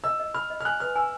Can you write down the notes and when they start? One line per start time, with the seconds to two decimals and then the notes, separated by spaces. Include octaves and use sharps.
0.04 D#5 E6
0.20 D#5
0.34 B5 F6
0.50 D#5
0.61 F6
0.65 G#5 F#6
0.80 B4 F6
0.96 G#5 E6